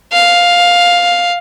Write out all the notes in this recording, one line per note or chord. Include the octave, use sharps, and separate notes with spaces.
F5